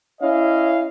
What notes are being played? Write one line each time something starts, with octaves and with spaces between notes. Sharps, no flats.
C#4 E4 C#5 D#5 F5